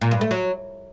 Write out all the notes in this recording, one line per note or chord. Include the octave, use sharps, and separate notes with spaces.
A#2
G2
A3
F#3